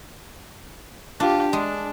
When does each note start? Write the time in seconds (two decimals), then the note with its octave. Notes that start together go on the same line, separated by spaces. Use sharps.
1.20 D4 F4 G4
1.53 G#3 D4